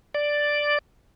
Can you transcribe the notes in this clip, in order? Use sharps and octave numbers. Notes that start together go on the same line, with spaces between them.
D5